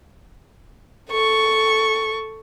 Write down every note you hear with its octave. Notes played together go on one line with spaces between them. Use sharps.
A4 C#6